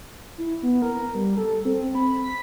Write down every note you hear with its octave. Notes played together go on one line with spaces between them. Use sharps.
E4
B3
A#4
G3
A4
C4
B5
B6